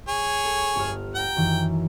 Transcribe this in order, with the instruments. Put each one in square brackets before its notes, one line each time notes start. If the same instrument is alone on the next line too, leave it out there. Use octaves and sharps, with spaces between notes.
[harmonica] G#4 C#5
[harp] A4
G1 F6
[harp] F#5 A#5 [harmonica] G5
[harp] F#2 D#3 E3